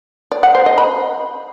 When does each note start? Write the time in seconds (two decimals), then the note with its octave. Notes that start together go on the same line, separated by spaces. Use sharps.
0.32 D5
0.43 F#5
0.55 C5
0.66 D#5
0.78 B5